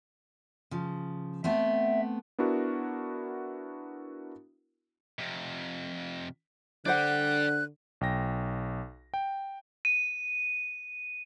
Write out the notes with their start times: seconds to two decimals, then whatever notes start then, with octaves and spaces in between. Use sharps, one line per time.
0.71 C#3 F3
1.44 A3 B3 C4 E5
2.39 B3 D4 E4 F#4 A#4
5.19 F2 C3
6.86 D3 D4 C5 D5 F#5 G5 F#6
8.01 B1 G5 A#6
9.14 G5
9.85 D#7